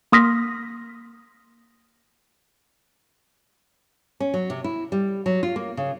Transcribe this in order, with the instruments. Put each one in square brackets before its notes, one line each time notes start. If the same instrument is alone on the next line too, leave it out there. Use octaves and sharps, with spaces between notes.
[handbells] A#3 C6 D#6 F6 A#6 B6
[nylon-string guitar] C#4
F#3
C3
E4
G3
F#3
F4
A#3
C#3